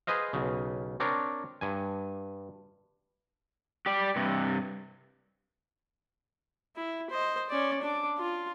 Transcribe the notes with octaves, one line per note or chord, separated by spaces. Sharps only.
G#4 B4 C5 D#5 F5
B1 C#3
C4 D4 A#4 C#5
G2 G#5
G4 D5
G2 C3
E4
C5 D#5
C#4 D5
D4 D6
F4